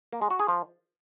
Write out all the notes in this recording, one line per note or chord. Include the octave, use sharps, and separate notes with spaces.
A#3
G#3
F#4
G#4
F3